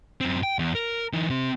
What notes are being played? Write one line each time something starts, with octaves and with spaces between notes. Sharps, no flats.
F#2 C4
G5
E2
A#4
E3 D#4
C3 C4